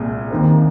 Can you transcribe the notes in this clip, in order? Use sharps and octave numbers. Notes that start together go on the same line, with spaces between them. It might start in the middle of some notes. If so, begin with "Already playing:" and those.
Already playing: C2 A#2 G#3
D#2 D#3 C4